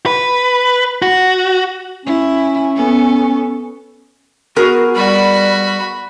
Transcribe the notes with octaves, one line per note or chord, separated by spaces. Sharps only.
B4
F#4
C#4 E4
B3 A4
B3 F#4 G#4 A#4
G3 F#4 B5